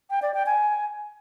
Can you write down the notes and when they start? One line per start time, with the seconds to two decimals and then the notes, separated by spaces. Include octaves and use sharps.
0.10 G5
0.22 D5
0.34 G5
0.46 G#5